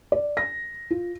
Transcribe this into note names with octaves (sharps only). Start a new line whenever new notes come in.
D5
A#6
F4